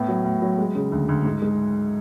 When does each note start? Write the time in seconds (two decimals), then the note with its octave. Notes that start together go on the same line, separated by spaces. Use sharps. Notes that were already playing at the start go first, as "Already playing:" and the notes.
Already playing: A2 B3
0.08 F#3
0.24 A2
0.42 F#3
0.58 G#3
0.75 C#3
0.92 D2
1.09 D2
1.25 G#2
1.42 G#3